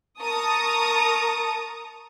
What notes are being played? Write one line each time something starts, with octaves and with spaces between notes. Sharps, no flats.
A#4 A5 A#5 C#6 D#6